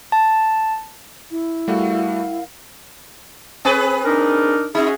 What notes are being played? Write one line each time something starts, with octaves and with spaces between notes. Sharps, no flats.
A5
E4
G3 A3 F#4 A#4 F5 F#5
C4 G#4 B4
D4 D#4 A#4
C#4 D#4 F#4 G#4